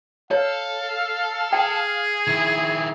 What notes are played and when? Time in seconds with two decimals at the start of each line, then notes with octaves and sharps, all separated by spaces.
0.31 A4 C#5 F5
1.53 G#4 G5
2.27 D#3 E4